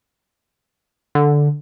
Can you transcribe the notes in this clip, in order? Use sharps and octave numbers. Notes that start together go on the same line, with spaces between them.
D3